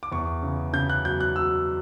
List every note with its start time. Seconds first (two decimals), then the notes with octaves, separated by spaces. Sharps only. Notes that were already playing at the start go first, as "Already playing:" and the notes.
0.03 D6
0.12 E2 C#6
0.43 C#3
0.73 C#3 G6
0.89 F#6
1.05 F#3 G6
1.20 F#6
1.36 F#3 E6